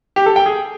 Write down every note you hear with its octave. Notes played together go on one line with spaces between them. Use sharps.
G4
A4
G5
G#4